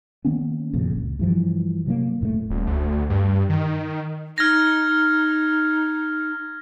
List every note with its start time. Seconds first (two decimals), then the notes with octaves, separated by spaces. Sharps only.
0.25 D#3 A#3 B3 C#4
0.73 F#1 F2 A#2 C#3
0.96 C#2
1.19 G2 E3 F3
1.86 C3 F#3 A#3
2.21 F1 A2 C3 A3
2.50 D#1
2.67 D2
3.10 G2
3.49 D#3
4.38 D#4 F6 G#6 A#6